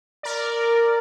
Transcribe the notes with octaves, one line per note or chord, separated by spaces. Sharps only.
A#4 D5